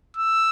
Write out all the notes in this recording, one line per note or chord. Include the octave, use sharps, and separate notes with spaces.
E6